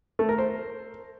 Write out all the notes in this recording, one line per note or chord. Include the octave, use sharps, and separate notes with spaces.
A3
A#4
C5